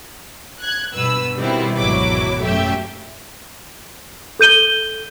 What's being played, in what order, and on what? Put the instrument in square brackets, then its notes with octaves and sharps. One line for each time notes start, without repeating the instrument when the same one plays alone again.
[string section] F#6 G#6
G2 B2 B4 E6
B2 D#3 G3 B3 C4 E4
G#1 E2 B2 F#3 E4 D6
F#2 A3 G4 E5
[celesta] A4 G6 D#7 G7